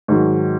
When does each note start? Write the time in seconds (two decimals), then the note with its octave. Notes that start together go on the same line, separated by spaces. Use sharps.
0.08 G#2 D#3 F#3